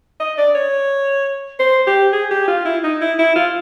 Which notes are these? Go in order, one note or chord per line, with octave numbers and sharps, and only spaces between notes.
D#5
D5
C#5
C5
G4
G#4
G4
F4
E4
D#4
E4
E4
F4